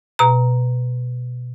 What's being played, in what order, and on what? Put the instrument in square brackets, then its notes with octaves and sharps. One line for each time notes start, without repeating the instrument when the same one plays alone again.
[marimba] B2 A#5